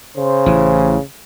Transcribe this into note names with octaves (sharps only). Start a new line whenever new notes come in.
C#3 C5
A1 E3